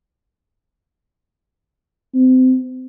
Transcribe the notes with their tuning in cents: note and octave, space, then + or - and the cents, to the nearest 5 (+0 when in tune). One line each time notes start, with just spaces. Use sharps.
C4 -25